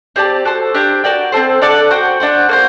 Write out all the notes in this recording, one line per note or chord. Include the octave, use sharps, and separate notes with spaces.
C4 G4 D5 A5
F#4 A4 C5
D4 G4 C5
F#4 A#4 D5 G5
C4 F#4 A4 C5
D4 A4 D5 F#5
F#4 C5 G5
D4 F#4 C5
A#3 F#4 C5